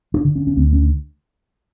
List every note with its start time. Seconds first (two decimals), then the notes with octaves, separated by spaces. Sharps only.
0.14 D4
0.25 D3
0.36 C#4
0.47 C#4
0.57 D2 C4
0.73 C#4